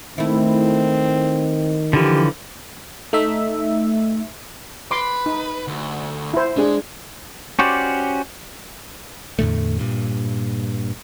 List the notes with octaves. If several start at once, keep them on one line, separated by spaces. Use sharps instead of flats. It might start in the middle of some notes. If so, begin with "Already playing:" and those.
D#3 A3 C4 E4
D3 E3 F3 G4
A3 D#4 E5
B4 C6 D6
D#4
D2
E4 C5
G#3 D4 G#4
C#4 F#4 G4 C5 D5
E2 A2 D3 A3
G2 A#2